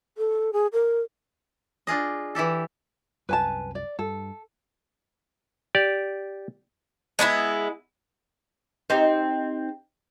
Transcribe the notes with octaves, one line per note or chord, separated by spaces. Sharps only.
A4
G#4
A#4
D4 F4 G#4 D#5
E3 E4 G4 A4
C2 F#2 B4 G#5 A5
D5
G2 A4
G4 D5
G#3 B3 D4 E4
C4 D#4 G4